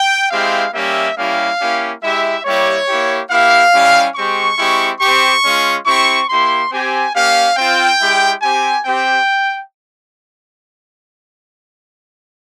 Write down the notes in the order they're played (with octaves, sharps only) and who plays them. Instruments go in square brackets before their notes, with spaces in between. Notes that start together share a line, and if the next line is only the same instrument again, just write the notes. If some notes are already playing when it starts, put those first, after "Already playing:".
Already playing: [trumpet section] G5
G#3 C4 E4 G4 F5
G3 A#3 C#4 G4 E5
G3 A#3 C#4 E4 G4 F5
A#3 C#4 E4 G4
G#3 E4 G4 E5
G3 A#3 E4 G4 C#5
A#3 E4 G4
A#3 E4 G4 F5
G3 C#4 E4 G4
G#3 C4 G4 C#6
G#3 C4 E4 G4
C4 G4 C#6
G#3 C#4 F4
C4 E4 G4 C#6
A#3 E4 G4 C6
C4 G4 G#5
A#3 C#4 G4 F5
C4 F4 G5
G#3 E4 G4
C4 G4 G#5
C4 G4 G5